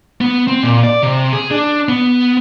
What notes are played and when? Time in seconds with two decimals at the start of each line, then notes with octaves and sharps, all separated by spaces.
0.21 B3
0.47 C4
0.63 A#2
0.83 D5
1.03 C3
1.33 G#4
1.51 D4
1.89 B3